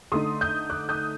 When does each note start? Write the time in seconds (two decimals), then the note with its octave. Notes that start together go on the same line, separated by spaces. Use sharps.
0.12 D3 A3 D#4 C6 D#6
0.41 D#6 G6
0.70 D6 F#6
0.89 D#6 G6